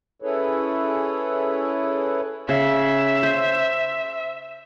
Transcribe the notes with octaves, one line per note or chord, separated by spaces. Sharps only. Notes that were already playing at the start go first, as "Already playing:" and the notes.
C#4 E4 G#4 A4 B4 C#5
C#3 E5
C5